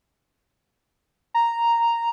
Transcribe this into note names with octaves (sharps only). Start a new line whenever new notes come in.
A#5